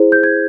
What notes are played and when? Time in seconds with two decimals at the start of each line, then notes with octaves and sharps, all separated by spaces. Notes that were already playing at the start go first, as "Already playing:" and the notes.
Already playing: E4 G#4 C5
0.12 G6
0.23 G#6